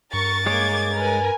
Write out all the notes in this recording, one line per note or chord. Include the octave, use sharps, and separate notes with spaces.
G2 A#4 C#6 A6
G#3 A#3 G#4 C#5 D6 G#6
A#4 B4 G#5